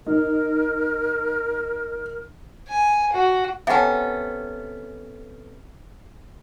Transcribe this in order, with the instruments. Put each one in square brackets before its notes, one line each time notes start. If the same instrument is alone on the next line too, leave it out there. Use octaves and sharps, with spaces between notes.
[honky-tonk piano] D#4 [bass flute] A#4
[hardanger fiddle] G#5
F#4
[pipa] C3 C#4 [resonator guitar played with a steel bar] B3 A4 [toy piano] E5 F#5 G5